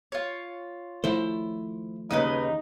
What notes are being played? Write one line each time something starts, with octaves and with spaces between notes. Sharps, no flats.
F4 C#5
D#3 F3 A3 E4 C5
D#2 C#3 D#4 B4 D#5